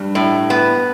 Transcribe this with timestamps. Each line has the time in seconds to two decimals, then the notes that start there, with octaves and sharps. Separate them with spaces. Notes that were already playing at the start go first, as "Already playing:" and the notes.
Already playing: G2 G3
0.15 A2
0.50 B3